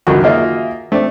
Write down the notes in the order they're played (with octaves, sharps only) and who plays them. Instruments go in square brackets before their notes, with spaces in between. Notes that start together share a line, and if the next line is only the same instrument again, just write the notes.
[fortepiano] C#2 F#2 D3 [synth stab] D#3 F#4
[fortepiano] A#3 F4 A#4 [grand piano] G#4 D#5 E5
[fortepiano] A3 [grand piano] C4 D4 D5